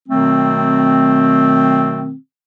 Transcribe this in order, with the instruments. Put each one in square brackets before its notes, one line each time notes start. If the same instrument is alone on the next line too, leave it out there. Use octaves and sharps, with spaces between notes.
[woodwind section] B2 D#3 F#3 A3 C4